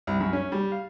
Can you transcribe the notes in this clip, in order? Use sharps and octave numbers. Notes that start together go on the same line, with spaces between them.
C2
F#2
C#4
G3
F5